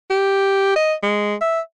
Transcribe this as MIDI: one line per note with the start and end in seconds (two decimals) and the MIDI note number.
0.10 0.73 67
0.76 0.93 75
1.03 1.35 56
1.41 1.60 76